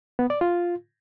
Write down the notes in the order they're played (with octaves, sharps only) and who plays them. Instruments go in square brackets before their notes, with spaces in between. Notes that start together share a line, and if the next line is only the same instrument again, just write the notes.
[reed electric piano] B3
D5
F4